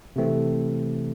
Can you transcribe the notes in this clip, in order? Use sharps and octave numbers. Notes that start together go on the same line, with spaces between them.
C3 E3 A3 C4